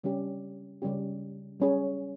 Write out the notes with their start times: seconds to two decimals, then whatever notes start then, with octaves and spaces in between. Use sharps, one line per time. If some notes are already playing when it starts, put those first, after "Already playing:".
0.03 C#3 G3 C#4 G4
0.82 C#3 G3 C#4 G4
1.60 G3 C#4 G#4